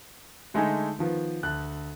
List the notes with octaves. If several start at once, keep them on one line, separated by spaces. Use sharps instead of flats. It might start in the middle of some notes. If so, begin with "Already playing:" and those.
D3 G#3 A3 D#4 E5 G#5
D#3 F3 B3
D2 A5 F#6